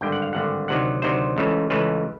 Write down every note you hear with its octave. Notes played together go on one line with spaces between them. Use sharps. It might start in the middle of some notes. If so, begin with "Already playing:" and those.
G#1 G2 D3 G5
F#5
F5
G#1 G2 D3 F#5
D2 C3 D#3 F#3 F#5
D2 C3 D#3 F#3 C5
C#2 C#3 E3 A3
C#2 C#3 E3 A3 B4